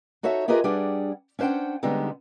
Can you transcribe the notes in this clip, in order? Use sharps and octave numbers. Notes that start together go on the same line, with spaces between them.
D#4 F#4 A4 C#5 E5 A5
F4 G4 G#4 A#4 B4 D#5
G3 D4 G4 G#4 F#5
C#4 D4 C5 F#5 G5
D3 G3 G#3 B3 C4 D#4